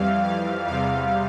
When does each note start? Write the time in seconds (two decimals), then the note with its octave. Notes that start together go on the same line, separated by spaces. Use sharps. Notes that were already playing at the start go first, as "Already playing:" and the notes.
Already playing: F2 E3 G3 F5
0.24 F5
0.67 E2 C3 G3 F5